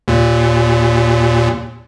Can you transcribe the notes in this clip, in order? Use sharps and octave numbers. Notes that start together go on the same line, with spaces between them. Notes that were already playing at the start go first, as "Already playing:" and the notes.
D#2 A#2